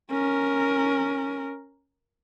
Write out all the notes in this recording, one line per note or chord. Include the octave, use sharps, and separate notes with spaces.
C#4 A#4